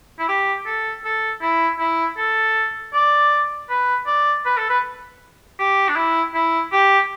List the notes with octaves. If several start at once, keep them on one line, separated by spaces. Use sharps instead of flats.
E4
G4
A4
A4
E4
E4
A4
D5
B4
D5
B4
A4
B4
G4
D4
E4
E4
G4